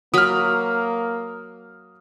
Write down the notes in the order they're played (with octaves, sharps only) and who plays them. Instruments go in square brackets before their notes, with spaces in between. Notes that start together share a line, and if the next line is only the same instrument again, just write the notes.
[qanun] F#3 B5 [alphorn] A#3 [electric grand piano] D#6 F6